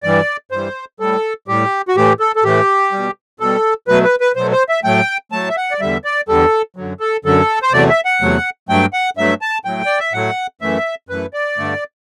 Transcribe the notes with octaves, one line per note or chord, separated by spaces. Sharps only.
G2 E3 G3 D5
G2 E3 G3 C5
A2 G3 A4
A2 G3 G4
F#4
A2 E3 A3 G4
A4
A4
A2 E3 A3 G4
B2 G3
B2 G3 A4
B2 F#3 A3 B4
B4
B4
B2 F#3 A3 C5
C5
E5
A2 F#3 A3 G5
A2 F#3 A3 A5
E5
F#5
D5
E2 D3 G3 E5
D5
E2 D3 G3 A4
F#2 D3 F#3
A4
F#2 D3 F#3 A4
C5
E2 C3 F#3 A3 D5
E5
F#5
E2 C3 F#3 A3
G2 F#3 A3 G5
F#5
G2 F#3 A3 E5
A5
A2 F#3 A3 G5
D5
E5
A2 F#3 A3 F#5
F#2 E3 A3 E5
F#2 E3 A3 B4
D5
G2 D3 A3